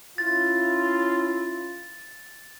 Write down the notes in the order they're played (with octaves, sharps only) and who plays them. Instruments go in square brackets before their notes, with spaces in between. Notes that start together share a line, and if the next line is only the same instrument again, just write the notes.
[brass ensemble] C#4 E4 F4 [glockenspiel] A6